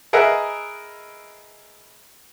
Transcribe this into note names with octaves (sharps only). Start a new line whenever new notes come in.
G#4 A#4 B4 D#5 E5 F#5